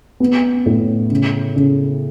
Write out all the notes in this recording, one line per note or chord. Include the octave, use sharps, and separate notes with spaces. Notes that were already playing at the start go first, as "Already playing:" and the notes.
B3
A2
C#3
C#3